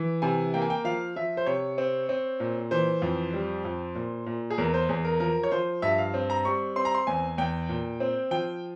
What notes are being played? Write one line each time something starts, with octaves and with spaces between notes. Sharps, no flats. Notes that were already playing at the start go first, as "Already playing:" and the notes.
Already playing: E3
C3 G#5
A#3 G5
G#5
G5
F3 F5
F3 E5
C5
C3 C#5
C4
C4
A#2
E3 C5
F2
G3
F2
A#2
A#2
G#4
E2 A#4
C5
E2 G#4
A#4
F3 A#4
C#5
F3 C5
G2 E5
F5
C4
A#5
G3 C#6
C4 C6
A#5
C6
E2 G#5
E2 G5
A#2
C4
F3 G5